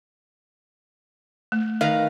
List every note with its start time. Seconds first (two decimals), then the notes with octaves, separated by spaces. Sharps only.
1.52 A3
1.81 D#3 B4 F5 A#5